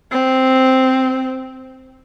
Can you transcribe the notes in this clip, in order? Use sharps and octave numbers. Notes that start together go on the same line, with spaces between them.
C4